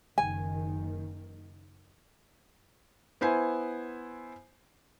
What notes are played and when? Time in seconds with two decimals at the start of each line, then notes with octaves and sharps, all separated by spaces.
0.18 F#1 D#3 G#5
3.21 B3 E4 C5 G#5